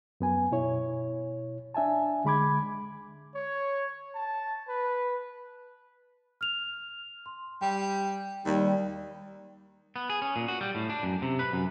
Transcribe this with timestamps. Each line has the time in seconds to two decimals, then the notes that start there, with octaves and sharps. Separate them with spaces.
0.21 F#2 B3 G#5
0.52 B2 E4 C#5
1.74 D4 E5 G#5 A5
2.25 D3 G#3 B5 D6 G#6
3.35 C#5
4.15 A5
4.69 B4
6.41 F6 F7
7.26 C6
7.61 G3 G5
8.45 D#2 G3
9.96 B3
10.10 G#4
10.22 C#4
10.36 A#2
10.48 F#4
10.61 G3
10.75 A2
10.90 D4
11.03 F#2
11.22 C3
11.39 B4
11.53 F#2